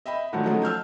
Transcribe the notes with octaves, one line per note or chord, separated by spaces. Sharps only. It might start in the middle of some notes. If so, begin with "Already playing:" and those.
D#5 E5 G5 B5
A2 D3 D#3 F3 F#3 A3
F3 F#3 G#3 A3 C#4 D#4
A5 E6 F6 G6